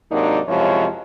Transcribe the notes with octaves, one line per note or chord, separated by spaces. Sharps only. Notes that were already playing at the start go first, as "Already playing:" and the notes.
G#2 C3 F#3 A#3 D4 D#4
F#2 C3 F3 G#3 E4 C#5